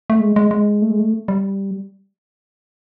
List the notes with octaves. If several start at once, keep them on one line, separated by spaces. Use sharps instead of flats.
A3
G#3
G#3
G#3
A3
G#3
A3
G3